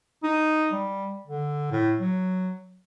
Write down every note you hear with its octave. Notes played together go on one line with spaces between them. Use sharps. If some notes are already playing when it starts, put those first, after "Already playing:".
D#4
G3
D3
A2
F#3